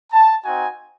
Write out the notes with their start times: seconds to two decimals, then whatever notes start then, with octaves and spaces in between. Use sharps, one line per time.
0.12 A5
0.45 C4 D#4 F#4 G#5